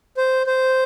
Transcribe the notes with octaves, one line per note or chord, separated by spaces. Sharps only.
C5
C5